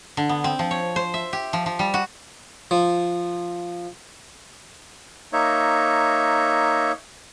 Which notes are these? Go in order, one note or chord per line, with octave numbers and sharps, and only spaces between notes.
D3
B3
C4
F3
C#5
C5
E5
G4
F3
F3
G3
F#4
F3
A#3 D#4 C#5 E5